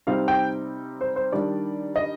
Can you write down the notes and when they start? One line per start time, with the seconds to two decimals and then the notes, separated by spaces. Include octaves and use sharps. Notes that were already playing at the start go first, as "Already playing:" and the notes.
0.07 C3 G3 C4 D#4 F5
0.28 G5
1.01 C5
1.16 C5
1.32 D#3 G3 D4 D5
1.96 D#5